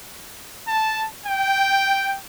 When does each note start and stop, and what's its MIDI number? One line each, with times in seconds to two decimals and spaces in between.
0.67 1.06 81
1.26 2.17 79